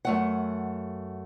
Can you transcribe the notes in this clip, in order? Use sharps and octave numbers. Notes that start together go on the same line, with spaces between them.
F#2 A3 F#5